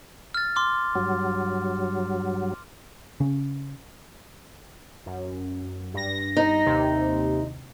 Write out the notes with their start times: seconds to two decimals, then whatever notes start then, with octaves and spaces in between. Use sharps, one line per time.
0.34 F6 A6
0.56 C6 D6 F6
0.95 G2 F#3
3.20 C#3 C#4
5.06 F#2
5.94 G2 A#6
6.37 D#4
6.66 D#2 C3